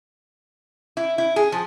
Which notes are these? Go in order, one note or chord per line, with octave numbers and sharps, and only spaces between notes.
E4
E4
G#4
F3